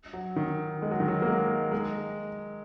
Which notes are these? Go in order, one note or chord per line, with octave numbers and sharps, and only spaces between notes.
F#3
D#3
G#3
F#3
D#3
F#3
A#3
G#3
G#3